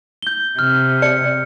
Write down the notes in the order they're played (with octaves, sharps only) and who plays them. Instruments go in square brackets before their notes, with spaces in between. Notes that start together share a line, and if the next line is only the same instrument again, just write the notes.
[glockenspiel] G6 G7
[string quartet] C3 [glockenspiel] F6
[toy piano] D5 [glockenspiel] C#7